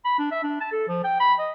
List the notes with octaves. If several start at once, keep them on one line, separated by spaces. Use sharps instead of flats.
B5
D4
E5
D4
A5
A4
F3
G5
B5
D#5